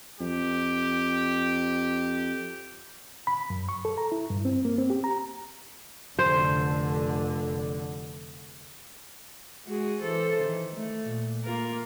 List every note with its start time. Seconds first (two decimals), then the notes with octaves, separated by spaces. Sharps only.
0.20 F2 G4
3.27 B5
3.50 F#2
3.69 C#6
3.85 A4
3.98 A#5
4.12 E4
4.30 G2
4.45 C4
4.65 A#3
4.78 C4
4.90 G4
5.04 A#5
6.19 F1 D3 C5
9.66 G#3 F#4 G#4
10.01 E3 A4 C5
10.40 D#3 E3
10.75 A3
11.05 A#2
11.44 A#3 F4 A#4